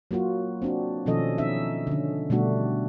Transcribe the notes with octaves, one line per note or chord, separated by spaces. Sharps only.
F#3 A#3 F4 F#4
C4 D4 F#4
B2 D#3 F3 C#4 A4 D#5
C#4 D#4 E5
D3 C#4
B2 G3 A3 D4 F#4